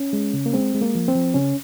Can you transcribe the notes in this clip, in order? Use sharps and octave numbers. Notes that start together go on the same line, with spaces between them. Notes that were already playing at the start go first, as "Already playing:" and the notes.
Already playing: C#4
G#3
C#3
A#3
G#3 C4
G#3
A#3
F3
C4
F3
C#3 C#4